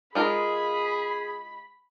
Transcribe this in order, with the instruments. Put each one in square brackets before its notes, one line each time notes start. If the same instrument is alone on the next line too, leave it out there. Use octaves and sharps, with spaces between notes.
[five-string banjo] G#3 F4 A#4 [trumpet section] G#4 [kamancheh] B5